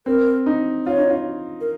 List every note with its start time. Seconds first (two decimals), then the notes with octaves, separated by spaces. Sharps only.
0.06 C4 A#4
0.46 D#4
0.86 F4 C#5
0.98 D#4
1.10 F4
1.61 A#4